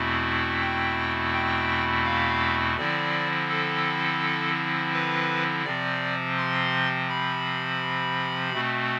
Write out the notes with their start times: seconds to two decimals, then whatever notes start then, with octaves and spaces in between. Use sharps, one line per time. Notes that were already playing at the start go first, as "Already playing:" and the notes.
Already playing: E2 B2 A3 C4 E4
0.61 G5
1.34 G5
2.05 F5
2.77 D3 F3 C4 E4 D5
3.50 A4
4.93 B4
5.65 C3 F3 C4 D5
6.38 C6
7.09 B5
8.54 B2 A3 C4